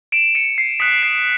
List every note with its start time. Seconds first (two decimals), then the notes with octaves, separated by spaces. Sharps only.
0.12 D7 E7
0.35 C#7 D#7
0.58 C7
0.80 D#6 F#6 B6 C#7
1.02 C7 D7